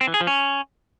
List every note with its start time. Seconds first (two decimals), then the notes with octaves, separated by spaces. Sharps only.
0.01 C4
0.07 E3
0.14 G#4
0.21 F3
0.27 C#4